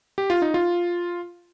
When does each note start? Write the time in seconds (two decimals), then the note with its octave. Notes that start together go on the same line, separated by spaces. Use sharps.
0.18 G4
0.30 F4
0.42 D#4
0.54 F4